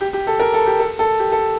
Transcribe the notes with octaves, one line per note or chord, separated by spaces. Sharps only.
G4
G4
A4
A#4
A4
G4
A4
A4
G4
A4